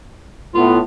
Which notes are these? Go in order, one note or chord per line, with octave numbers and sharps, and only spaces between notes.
A2 B3 F4